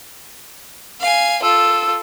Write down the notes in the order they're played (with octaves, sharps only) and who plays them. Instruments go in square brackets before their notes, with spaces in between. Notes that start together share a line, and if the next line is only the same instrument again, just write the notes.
[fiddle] F5 G#5
[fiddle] F4 A4 [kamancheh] E6